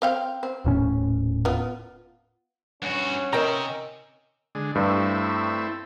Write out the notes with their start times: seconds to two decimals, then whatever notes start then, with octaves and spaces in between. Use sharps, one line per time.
0.02 C4 F5 G5
0.43 C4
0.65 D#1 A2 C#4
1.45 B3 F4
2.82 G2 C#4 F#4 F#5
3.33 C3 D#4 A#4 D#5 E5 G5 A#5
4.55 D3 G#3
4.75 G2 A3 C4 E4